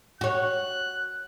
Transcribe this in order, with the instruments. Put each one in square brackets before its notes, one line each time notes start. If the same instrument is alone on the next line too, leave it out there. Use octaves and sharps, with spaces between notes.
[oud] F#4 C#5 [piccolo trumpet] F#6